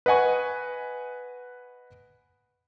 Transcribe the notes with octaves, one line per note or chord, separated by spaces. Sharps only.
B4 D#5 F#5 G#5 C#6